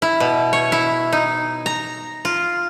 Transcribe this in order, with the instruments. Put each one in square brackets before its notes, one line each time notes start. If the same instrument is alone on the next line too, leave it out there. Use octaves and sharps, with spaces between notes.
[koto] E4
B2
C#5
E4
D#4
A#5
F4